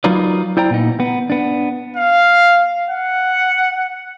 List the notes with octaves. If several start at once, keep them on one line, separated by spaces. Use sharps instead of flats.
F#3 D#4 F4 A#4 B4 D5
E4 C5 D5 G5 A#5
A#2 B3 D#4
B3
B3 D4
F5
F#5